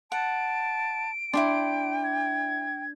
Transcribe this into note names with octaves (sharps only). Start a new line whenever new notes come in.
F#5 A5 D7
D4 E4 G#4 G5 C6
G#6